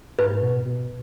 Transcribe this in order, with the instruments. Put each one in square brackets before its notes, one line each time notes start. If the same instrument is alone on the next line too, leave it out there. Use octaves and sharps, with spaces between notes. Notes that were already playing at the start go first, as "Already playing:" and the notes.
[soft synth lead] G#2 [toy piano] B4
[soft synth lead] B2
B2